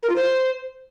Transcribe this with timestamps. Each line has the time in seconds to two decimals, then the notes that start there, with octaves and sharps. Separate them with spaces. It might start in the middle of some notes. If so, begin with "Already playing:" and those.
0.03 A#4
0.09 F4
0.16 C5